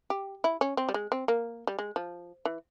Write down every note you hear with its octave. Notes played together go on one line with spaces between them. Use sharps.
G4
E4
C#4
C4
G3
G#3
C4
A#3
G3
G#3
F3
E3